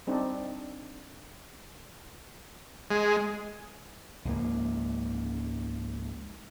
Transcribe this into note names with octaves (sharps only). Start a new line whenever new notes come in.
G3 C4 D4 D#4 A4
G#3
C#2 G#2 F3 A#3